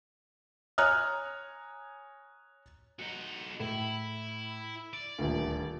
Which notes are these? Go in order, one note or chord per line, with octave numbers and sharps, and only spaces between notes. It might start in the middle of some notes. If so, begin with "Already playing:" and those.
C#5 G#5 A#5 D#6 F6 F#6
D#4 F#4
A2 E4
D5
D#1 D2